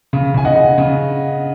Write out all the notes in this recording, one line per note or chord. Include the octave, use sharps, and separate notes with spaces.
C#3
C#3 G#5
D#5 F#5
C#3
C#3